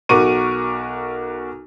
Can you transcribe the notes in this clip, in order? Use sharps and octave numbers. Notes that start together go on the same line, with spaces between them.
B1 F#4 A#4 C#6 D6 D#7